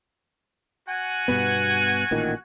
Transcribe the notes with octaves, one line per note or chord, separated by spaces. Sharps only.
F#4 F#5 G#5
G2 B2 B3
A1 A#2 D#3